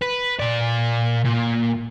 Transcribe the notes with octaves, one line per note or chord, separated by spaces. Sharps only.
B4
A#2 D5
A#2